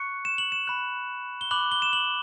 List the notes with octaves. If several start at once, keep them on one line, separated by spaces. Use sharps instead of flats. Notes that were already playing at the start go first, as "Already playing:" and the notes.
Already playing: C#6 F#6 C#7
E7
F#7
E7
B5 F#6
G7
B5 D6 F#6 F#7
G7
E7
F#7